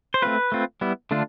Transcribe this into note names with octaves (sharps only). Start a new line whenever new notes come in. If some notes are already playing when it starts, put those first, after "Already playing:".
C5
A3 C4 F4 B4
A3 C4 F4
G3 B3 E4
D3 A3 D4 F4